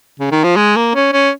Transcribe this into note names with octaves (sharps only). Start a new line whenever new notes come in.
C#3
D#3
F3
G#3
A#3
C#4
C#4